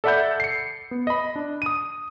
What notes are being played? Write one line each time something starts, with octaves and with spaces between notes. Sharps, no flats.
A4 D5 E5 F#5 B5 G6
C7 C#7
B3
D#5 B5
D4
D#6 D#7